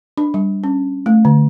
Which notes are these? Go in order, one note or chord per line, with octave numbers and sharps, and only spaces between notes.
D4
G3
C#4
A3
D3